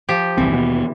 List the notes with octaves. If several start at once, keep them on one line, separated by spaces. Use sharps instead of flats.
F3 G4
D#1 C2 E3 C4
D#2 B2 B3